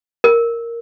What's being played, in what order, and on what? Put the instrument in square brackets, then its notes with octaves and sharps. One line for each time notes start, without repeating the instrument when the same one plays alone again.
[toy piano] A#4